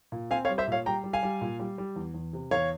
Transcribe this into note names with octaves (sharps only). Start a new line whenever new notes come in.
A#2
C4 F5 G#5
C#5 F5
G3
C5 E5
A#2 C#5 F5
G3 G5 A#5
G3
F5 G#5
G3
A#2
G3
G3
E2
E2
C3
E2 C#5 F5